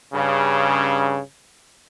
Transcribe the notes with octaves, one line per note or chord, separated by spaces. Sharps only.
G2 C#3